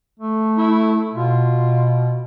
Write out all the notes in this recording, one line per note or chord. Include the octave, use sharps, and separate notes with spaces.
A3
E4
B2 F4